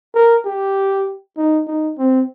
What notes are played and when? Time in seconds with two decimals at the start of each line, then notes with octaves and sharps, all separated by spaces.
0.15 A#4
0.45 G4
1.37 D#4
1.67 D#4
1.98 C4